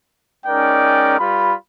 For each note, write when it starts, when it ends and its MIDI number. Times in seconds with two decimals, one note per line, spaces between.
0.45 1.18 56
0.45 1.18 61
0.45 1.18 63
0.45 1.18 70
0.45 1.18 74
0.45 1.18 79
1.20 1.54 55
1.20 1.54 65
1.20 1.54 71
1.20 1.54 83